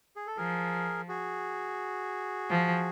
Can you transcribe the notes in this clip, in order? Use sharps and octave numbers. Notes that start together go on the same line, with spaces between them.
G#4
A4
F3 G#4 A#4
F#4 G#4
F3